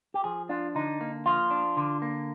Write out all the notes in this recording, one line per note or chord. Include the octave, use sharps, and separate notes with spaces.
G4
F3 G#4
D4 F4
D3 D#4
A#3
F3 F4
D4
D3
A#3